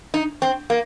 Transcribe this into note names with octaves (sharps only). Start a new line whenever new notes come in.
D#4
C4
A#3